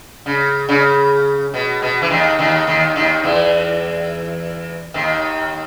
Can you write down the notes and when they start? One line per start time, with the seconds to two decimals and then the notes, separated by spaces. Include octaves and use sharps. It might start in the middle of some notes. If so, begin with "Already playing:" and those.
0.26 C#3
0.69 C#3
1.54 B2
1.82 B2
2.02 E3
2.10 D#2 D#3
2.39 D#2 D#3
2.67 D#2 D#3
2.96 D#2 D#3
3.24 E2 E3
4.94 D#2 D#3